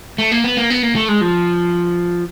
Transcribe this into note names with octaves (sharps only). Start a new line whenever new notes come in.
A3
A#3
B3
A#3
B3
A#3
A3
G#3
F3